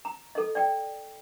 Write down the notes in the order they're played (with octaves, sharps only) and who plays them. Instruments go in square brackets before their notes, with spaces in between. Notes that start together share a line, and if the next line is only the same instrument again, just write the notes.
[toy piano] A#5
A4 D#5
D5 G5